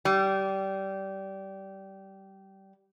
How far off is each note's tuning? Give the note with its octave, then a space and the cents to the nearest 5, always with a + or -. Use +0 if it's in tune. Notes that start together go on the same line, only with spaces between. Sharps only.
G3 -20